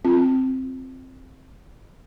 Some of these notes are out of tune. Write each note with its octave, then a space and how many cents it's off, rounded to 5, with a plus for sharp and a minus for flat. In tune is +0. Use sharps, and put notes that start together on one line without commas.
C4 +0 F4 -5